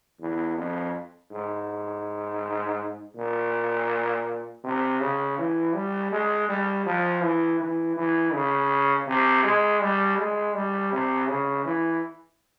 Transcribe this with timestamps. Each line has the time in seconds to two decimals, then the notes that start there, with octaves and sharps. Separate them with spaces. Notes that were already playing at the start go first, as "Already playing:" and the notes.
0.20 E2
0.57 F2
1.31 G#2
3.16 A#2
4.63 C3
5.00 C#3
5.38 E3
5.74 G3
6.12 G#3
6.49 G3
6.86 F3
7.22 E3
7.59 E3
7.97 E3
8.33 C#3
9.07 C3
9.44 G#3
9.80 G3
10.18 G#3
10.55 G3
10.92 C3
11.28 C#3
11.65 E3